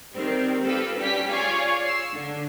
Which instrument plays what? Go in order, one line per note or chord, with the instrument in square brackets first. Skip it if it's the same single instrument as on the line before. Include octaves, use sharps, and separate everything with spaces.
[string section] D#3 G3 C4
C4 F4 G4 A4 B4
G2 G3 C#4 G4 B6
F4 G#4 C#5 D5 F5
E6 C7
D3